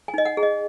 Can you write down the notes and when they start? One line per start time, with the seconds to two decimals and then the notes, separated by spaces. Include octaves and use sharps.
0.08 G#5
0.14 D#4 D#5
0.25 F#5
0.37 G#4
0.43 D#5